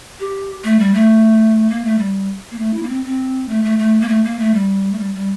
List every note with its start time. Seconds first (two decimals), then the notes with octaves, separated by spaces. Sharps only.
0.20 G4
0.64 A3
0.79 G3
0.94 A3
1.70 A#3
1.84 A3
1.99 G3
2.51 A#3
2.59 A3
2.74 E4
2.83 A#3
2.89 C4
3.05 C4
3.49 A3
3.64 A3
3.79 A3
4.01 A#3
4.09 A3
4.24 A#3
4.39 A3
4.54 G3
4.92 A3
4.99 G3
5.15 G3